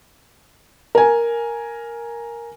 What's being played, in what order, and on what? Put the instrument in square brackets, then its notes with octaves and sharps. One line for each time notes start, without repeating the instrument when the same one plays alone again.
[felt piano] A#4 G#5